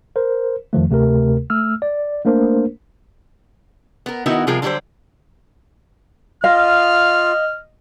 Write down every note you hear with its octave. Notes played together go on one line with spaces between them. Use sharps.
A#4 C5
F2 D#3 F3 A3
D2 C3 A3 G4 A#4
A3 E6 F6
D5
A3 A#3 D4 A#4 C5
B3 A#4
D#3 B3 D#4 E4 F#4 A#4
C3 F3 G3 F4 G#4 A#4
D3 F#3 G3 D#4 G4 C5
F4 D#5 F5 F6